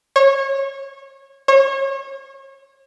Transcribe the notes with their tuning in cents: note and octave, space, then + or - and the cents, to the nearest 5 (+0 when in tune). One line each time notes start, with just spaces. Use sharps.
C#5 -25
C#5 -35